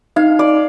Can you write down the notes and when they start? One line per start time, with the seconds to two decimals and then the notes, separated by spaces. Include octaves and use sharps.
0.16 D#4 F5
0.39 D5